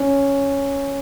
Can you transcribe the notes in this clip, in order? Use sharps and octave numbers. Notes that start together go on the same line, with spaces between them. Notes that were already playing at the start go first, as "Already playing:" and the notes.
Already playing: C#4